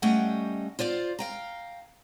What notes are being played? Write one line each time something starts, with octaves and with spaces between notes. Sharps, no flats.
G3 A3 C#4 D#5 F#5 G5
F4 C5 D5 F5
F5 G5 A#5